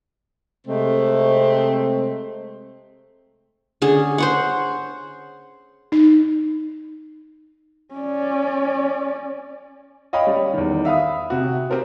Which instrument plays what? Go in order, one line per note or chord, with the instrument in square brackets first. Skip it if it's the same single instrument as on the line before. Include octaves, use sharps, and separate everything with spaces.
[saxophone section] C3 G#3 A3 C4
[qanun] D3 C#4 G#4
C5 C#5 F#5
[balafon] D#4
[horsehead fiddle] C#4 D5
[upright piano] C#5 D#5 F5 G5 B5
G3 C#4
E2 D#3
E5 F5 B5 D#6
C3 F#4
C4 G4 A#4 C5